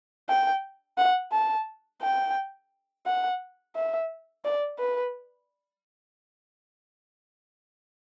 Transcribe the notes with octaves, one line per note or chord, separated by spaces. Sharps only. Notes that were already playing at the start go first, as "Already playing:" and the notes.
G5
F#5
A5
G5
F#5
E5
D5
B4